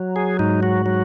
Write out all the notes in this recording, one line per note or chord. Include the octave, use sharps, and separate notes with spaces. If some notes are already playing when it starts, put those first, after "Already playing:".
Already playing: F#3
G#4
G#2 D#4
F#4
F#3